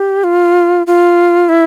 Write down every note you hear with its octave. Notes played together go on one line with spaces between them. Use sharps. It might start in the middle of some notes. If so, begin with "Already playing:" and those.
Already playing: G4
F4
F4
E4